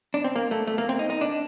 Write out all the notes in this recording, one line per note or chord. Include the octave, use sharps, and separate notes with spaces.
D4
C4
A#3
A3
A3
A#3
C4
D#4
D#4
D4